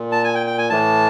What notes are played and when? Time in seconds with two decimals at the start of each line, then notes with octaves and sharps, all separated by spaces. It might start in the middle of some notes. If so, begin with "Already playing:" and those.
Already playing: A#2
0.12 A5
0.24 G#5
0.35 G5
0.47 G5
0.58 G#5
0.70 A2 E3 A5